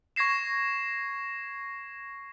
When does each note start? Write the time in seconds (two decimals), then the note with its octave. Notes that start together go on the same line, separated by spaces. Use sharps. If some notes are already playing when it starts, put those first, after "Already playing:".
0.16 C#6 G#6 A#6 C7 E7